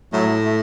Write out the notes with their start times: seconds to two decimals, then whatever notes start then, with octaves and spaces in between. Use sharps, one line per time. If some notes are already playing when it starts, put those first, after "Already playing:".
0.13 A2 F#3 A3
0.45 A3